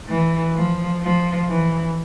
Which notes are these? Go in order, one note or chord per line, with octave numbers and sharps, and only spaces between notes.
E3
F3
F3
E3